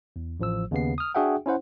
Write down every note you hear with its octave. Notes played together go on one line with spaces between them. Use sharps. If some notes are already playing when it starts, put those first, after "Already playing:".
E2
A1 F3 E6
D#2 C#3 B3 C7
D#6 F6
D4 F#4 G#4 E5 F#5 G5
C#4 E4 C5 F#5